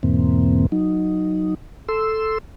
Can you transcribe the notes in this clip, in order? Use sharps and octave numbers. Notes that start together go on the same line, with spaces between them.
E2 G#2 B2 E3 A#3 C4
F#3 D#4
A4 C6 E6